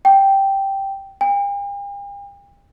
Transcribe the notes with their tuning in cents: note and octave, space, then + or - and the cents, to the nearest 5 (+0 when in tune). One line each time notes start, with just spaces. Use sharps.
G5 -5
G5 +45